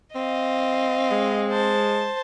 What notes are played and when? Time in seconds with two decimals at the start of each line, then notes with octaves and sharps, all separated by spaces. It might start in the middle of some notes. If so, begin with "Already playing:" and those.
0.15 C4 D#5 F5
1.11 G#3
1.49 C5 A5